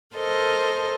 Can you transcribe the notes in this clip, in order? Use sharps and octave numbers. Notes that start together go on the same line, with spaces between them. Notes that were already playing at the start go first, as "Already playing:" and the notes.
A4 A#4 C5 D#5